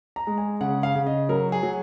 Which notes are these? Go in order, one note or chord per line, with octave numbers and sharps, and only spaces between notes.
A#5
G#3
G#5
C#3 F#5
F5
C#3
D#5
F#3 A#4
G#4
F#3